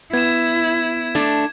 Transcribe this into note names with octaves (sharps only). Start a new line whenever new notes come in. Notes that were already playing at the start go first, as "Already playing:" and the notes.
B3 E4 G#6 E7
A3 D4